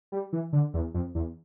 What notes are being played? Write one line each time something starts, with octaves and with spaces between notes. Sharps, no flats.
G3
E3
D3
E2
F2
E2